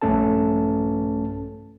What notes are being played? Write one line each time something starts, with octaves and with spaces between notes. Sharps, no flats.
A#1 G2 A3 C#4 A4 A5